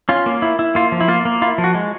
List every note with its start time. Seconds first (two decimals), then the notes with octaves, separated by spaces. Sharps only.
0.09 C#4 F4
0.26 A#3
0.42 E4
0.59 E4
0.75 A#3 F4
0.92 F3
1.01 E4
1.08 A#3 F4
1.25 A#3
1.42 E4 F4
1.58 F3
1.64 F#4
1.75 G#3